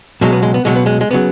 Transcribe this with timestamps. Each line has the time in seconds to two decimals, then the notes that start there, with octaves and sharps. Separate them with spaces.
0.21 C#2 B2 F#3 G#3
0.33 B3
0.43 G#3
0.54 B3
0.65 C#2 B2 F#3 G#3
0.76 B3
0.86 G#3
1.01 G#3
1.11 C#3 F#3 B3